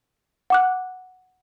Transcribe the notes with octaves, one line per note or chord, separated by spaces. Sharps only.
F#5 D6 F#6